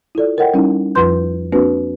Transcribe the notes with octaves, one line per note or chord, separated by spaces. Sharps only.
E4 F4 A4 D5
A4 A#4 C#5 D#5 F#5 G5
G3 C#4 D#4 E4
F2 F3 F4 B4 C6 G6
A#3 C4 D4 F#4 B4